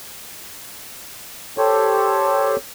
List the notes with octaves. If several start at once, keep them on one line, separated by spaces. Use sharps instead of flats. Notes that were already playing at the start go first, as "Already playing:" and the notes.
G4 A4 C5 C#5